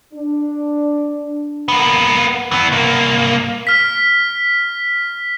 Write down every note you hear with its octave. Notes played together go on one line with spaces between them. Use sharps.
D4
A#3 B3
E3 B3
C2 A#3
F6 B6